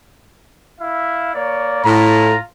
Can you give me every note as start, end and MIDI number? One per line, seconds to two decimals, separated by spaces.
0.80 1.33 64
0.80 1.33 76
0.80 1.33 77
1.34 1.82 58
1.34 1.82 73
1.34 1.82 74
1.84 2.35 45
1.84 2.41 65
1.84 2.41 82